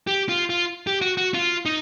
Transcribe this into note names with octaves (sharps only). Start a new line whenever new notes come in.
G4
F4
F4
G4
F#4
F#4
F4
D#4